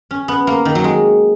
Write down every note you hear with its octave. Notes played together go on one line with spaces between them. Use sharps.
C#4
B3
A#3
D#3
F#3
G#3